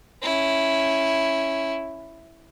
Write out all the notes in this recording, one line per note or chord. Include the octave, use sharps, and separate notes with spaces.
C#4 E4